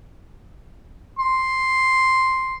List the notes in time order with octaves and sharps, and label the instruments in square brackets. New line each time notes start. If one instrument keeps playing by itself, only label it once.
[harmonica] C6